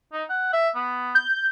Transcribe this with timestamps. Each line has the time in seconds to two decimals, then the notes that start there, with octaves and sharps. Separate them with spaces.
0.13 D#4
0.30 F#5
0.53 E5
0.76 B3
1.15 G6